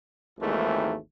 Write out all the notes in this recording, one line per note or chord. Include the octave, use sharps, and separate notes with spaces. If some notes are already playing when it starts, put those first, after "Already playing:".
G#1 D#2 G#2 E3 A3